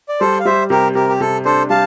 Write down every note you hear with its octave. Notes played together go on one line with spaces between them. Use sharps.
D5
G3 A4 C5
F5
G3 C5 E5
C3 G4 A#4
C3 G4 A#4
G4
C3 A4
D4 A4 C5
G3 F5 A5